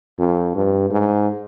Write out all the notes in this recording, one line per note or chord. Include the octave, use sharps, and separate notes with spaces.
F2
G2
G#2